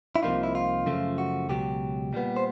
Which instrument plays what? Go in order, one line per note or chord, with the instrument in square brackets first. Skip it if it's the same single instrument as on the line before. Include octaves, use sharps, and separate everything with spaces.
[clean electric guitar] E4
C2 C3 F3 A#3 D#4 F4
E4
F4
F#2 C#3 F3 A3
F#4
C#2 B2 F#3 G4
A#2 G3 B3
C5